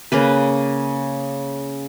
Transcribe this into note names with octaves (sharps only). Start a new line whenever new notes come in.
C#3 A#3 B4